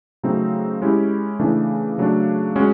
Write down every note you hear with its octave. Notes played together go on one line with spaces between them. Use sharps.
C#3 F#3 A3 C4 D#4
G#3 C#4 E4 G4
C#3 E3 A3 D4
C#3 F#3 A3 D4
G#3 C#4 F#4